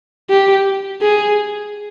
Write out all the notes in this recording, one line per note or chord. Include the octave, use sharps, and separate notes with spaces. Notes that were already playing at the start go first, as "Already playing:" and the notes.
G4
G#4